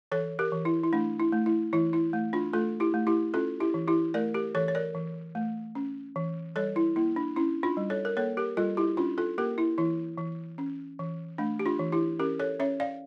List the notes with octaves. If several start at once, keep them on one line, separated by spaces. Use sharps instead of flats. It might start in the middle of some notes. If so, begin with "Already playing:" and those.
E3 A4 C#5
G4 A#4
E3
E4
E4
A3 D4
E4
A3
E4
E3 E4
E4
A3
D4 F4
A3 F4 A4
E4 G4
A3
E4 G4
C#4 F4 A4
E4 G4
E3
E4 G4
A3 A#4 D5
G4 A#4
E3 A4 C#5
C#5
A#4 D5
E3
A3
C#4
E3
G3 A4 C#5
E4
A#3 E4
D4
C#4 E4
D4 F4
G3
A4 C#5
A#4
A#3 A4 C#5
G4 A#4
G3 F4 A4
E4 G4
C#4 D4 F4
F4 A4
A#3 G4 A#4
E4
E3 E4
E3
C#4
E3
A3 D4
G4
D4 F4
E3
E4 G4
C#4 G4 A#4
A4 C#5
C#4 C#5 E5
D5 F5